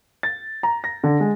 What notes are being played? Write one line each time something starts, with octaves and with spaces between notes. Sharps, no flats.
A6
A#5
A#6
D3
G#3